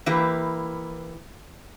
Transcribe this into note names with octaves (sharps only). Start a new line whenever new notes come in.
E3 A#3 E4 G4 B4